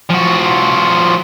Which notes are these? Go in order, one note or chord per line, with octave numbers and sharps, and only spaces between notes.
F3 F#4